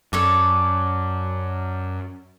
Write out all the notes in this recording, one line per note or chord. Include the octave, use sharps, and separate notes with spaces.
F#2 A4 C#5 D5